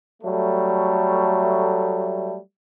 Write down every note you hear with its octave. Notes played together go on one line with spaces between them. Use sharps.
F#3 G3 A3